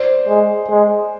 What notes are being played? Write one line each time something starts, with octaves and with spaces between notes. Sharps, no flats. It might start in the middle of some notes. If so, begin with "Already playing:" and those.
Already playing: C5 D5
G#3
G#3